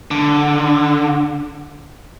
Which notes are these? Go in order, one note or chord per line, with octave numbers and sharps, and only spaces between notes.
D3